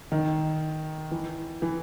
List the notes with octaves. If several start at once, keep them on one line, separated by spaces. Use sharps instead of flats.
D#3
E3
E3